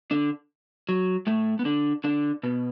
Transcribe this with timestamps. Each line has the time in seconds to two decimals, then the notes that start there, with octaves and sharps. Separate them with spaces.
0.11 D3 D4
0.89 F#3
1.27 A2 A3
1.59 B3
1.65 D3 D4
2.04 D3 D4
2.43 B2 B3